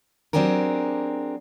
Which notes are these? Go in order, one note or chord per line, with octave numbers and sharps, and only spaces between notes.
F#3 C4 D4 G4 G#4 A#4